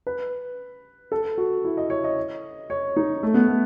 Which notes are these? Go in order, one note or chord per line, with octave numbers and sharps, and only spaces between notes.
B4
A4
F#4
E4
D#5
C#5
D#5
C#5
D#4
A3
B3
A3